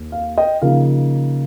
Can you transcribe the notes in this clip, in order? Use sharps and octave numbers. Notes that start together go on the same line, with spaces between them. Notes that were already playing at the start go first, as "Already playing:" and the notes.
Already playing: D#2
F5
D#5 G5
C#3 F3 A#3 D#4 F5